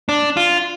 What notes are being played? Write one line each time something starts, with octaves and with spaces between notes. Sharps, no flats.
D4
F4